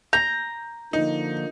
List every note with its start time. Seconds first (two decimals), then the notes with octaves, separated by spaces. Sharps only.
0.13 A#5 G6
0.93 D3 F3 A#3 D#4